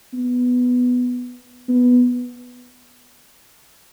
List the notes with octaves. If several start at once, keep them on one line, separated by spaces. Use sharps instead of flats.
B3
B3